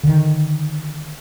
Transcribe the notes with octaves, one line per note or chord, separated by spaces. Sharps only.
D3 D#3